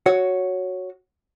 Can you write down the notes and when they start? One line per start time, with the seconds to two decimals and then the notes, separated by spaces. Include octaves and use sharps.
0.06 F#4 C#5 F#5